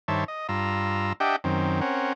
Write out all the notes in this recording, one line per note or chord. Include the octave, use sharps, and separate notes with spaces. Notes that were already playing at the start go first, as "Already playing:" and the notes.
G2 D#3 C5 C#5 E5 A5
D#5
G2 F4 A#5 E6
D4 G4 D#5 E5 F#5 G5
F#2 D#3 C4
C4 C#4 A#4 F#5